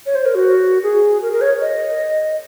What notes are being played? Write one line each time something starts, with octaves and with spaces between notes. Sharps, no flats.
C#5
C5
A#4
F#4
G#4
A#4
A#4
C#5
D#5